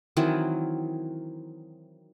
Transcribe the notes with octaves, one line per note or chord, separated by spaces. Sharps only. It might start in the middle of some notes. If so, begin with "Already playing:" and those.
D#3 E3 F#3 C4